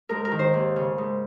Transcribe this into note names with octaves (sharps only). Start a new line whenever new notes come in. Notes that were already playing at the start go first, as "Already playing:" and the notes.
G#2 A#4
A#4
D#3
C5
D#2
C#3
G#2